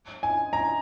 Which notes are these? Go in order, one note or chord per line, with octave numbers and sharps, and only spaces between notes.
G#5
A#5